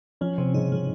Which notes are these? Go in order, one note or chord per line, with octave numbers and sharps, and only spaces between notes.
F3 C#4
C3 C4
C#3 D#4
C#3 F3